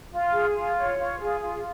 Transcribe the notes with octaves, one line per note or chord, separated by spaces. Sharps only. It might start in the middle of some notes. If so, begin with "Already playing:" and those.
F4
G#4
F4
C#5
F4
G#4
F4